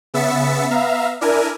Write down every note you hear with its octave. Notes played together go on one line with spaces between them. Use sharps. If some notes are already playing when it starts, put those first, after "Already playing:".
C#3 B3 E5 A6 B6 C#7
B3 E5 F5 A#5
D4 E4 A#4 G#5